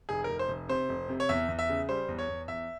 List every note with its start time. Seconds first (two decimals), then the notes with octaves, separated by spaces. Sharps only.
0.09 F1 G#4
0.24 A#4
0.29 F1
0.39 C5
0.49 F1
0.69 C3 C5
0.89 F1
1.09 C3
1.20 C#5
1.29 E2 E5
1.48 E2
1.59 E5
1.69 C#3
1.88 G3 C5
2.09 E2
2.19 C#5
2.28 E2
2.48 E2 E5